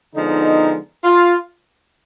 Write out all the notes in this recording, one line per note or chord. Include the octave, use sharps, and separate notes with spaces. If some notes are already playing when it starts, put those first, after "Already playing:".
D3 F3 G#3 B3 D#4
F4